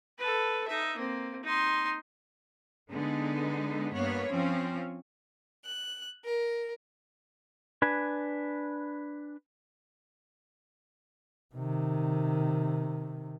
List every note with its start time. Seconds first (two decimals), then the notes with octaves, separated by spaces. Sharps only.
0.18 A4 B4
0.67 D#4 E5
0.97 A#3 C4
1.43 D#4 C6
2.92 D3 G#3 B3 D#4
3.94 G2 A#3 B3 C#5
4.30 F3 C4 C#4
5.66 F#6
6.25 A#4
7.82 D4 B4 G#5
11.55 C3 D#3